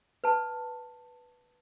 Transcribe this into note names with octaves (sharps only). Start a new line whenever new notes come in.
B4 A5